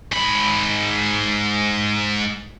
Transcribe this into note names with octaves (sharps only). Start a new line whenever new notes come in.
G#2 B5